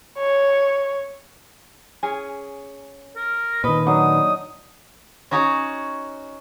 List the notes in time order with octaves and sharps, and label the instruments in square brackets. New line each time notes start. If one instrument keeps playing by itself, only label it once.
[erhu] C#5
[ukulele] C#4 G#4
[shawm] A#4
[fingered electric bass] A#2 D#3 [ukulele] B4 [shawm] D#5
[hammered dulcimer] F#3 D4 D#4 [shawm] D#6
[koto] C#4 D#4 F#4 C#5